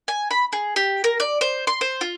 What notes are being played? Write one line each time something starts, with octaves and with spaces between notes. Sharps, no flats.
G#5
B5
G#4
G4
A#4
D5
C5
C6
C5
F4